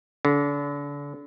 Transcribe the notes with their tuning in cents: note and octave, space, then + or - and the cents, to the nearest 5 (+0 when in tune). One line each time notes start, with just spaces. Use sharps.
D3 -35